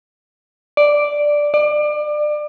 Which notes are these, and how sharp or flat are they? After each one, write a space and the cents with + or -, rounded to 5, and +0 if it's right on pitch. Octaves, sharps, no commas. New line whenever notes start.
D5 +0
D5 +30